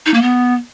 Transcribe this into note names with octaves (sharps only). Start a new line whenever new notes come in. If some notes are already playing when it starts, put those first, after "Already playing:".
D#4
A#3
B3